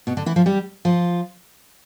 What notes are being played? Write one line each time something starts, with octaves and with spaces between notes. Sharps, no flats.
B2 B3
D3 D4
E3 E4
F3 F4
G3 G4
F3 F4